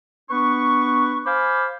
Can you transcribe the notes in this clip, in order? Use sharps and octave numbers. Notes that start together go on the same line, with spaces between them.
B3 D4 B4 C#6
C5 F5 G#5 B5 D6